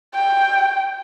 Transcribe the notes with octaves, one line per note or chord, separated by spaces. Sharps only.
G5